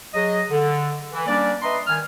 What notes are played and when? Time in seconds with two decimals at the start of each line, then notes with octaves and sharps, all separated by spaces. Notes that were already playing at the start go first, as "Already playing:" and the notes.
0.14 F#3 G#4 D#5
0.50 D3
1.13 E3
1.27 G3 A#3 C#4 D4 D5
1.62 B4 D#5 E5 A#5 C6
1.87 D#3 G#5 F6